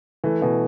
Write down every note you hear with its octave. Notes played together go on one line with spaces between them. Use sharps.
E3 A3
B2 E3